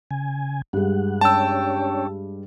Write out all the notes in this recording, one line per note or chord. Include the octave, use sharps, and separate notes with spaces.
C#3 G#5
G2 G#3 F#5
C#4 D4 C#5 G5 A5 E6